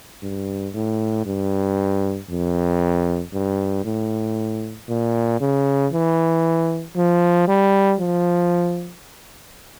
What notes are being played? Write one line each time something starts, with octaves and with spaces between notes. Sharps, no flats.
G2
A2
G2
F2
G2
A2
A#2
C#3
E3
F3
G3
F3